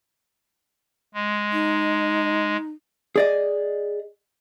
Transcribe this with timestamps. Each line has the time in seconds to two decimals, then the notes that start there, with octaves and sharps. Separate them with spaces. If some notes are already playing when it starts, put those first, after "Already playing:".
1.14 G#3
1.53 D#4
3.16 G#4 D5 D#5